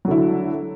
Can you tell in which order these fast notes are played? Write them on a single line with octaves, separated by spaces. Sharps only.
F#3 D3 E4